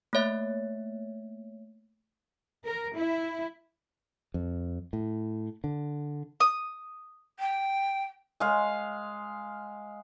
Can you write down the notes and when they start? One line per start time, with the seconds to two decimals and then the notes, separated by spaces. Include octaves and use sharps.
0.13 A3 A#3 C#5 E5
2.65 A#4
2.97 E4
4.34 F2
4.93 A2
5.64 D3
6.40 D#6
7.40 G5
8.40 G#3 F5